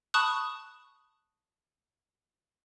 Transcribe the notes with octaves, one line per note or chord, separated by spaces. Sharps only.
A5 B5 C#6 D#6 F#6